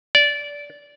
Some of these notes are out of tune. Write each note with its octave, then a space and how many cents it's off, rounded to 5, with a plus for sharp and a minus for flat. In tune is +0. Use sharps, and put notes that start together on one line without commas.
D5 -20